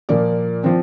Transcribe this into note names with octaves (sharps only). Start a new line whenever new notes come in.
A#2 F3 A#3 D5
F3 C4